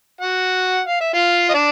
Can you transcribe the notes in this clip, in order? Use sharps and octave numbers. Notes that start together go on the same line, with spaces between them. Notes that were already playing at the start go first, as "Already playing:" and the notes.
F#4 F#5
F5
E5
F4 F5
D#5
D4 D5